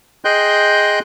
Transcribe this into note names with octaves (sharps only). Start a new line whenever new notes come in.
G#4 D#5 G5 C6 F#6 G6